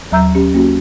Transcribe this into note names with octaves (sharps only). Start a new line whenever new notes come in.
D#2 F#3 E5 A#5 E6 G6
C#4 G4
A#3 C#4 F#4